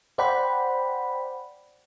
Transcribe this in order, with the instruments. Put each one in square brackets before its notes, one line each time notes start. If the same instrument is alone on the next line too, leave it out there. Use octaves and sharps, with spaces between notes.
[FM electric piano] C5 D5 F#5 G5 B5